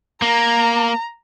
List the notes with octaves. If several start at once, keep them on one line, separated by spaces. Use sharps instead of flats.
A#3 A#5